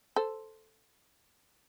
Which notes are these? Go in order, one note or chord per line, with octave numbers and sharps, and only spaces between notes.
A4 C5